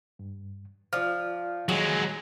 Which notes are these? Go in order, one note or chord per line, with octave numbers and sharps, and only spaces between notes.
G2
F3 F4 D5 F6
D#3 F3 F#3 G#3 G#4